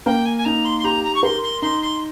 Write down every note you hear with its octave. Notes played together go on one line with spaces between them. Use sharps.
A#3 G5
G#5
G#5
D#4 A#5
C6
C6
G4 A#5
A#5
C#6
A#4 C6
C6
D#4 C6
C6